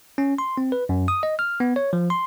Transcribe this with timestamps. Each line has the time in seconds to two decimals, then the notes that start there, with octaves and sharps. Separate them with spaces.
0.18 C#4
0.38 C6
0.58 C4
0.72 B4
0.89 F#2
1.08 D#6
1.23 D#5
1.39 F6
1.60 B3
1.76 C#5
1.93 F3
2.10 C6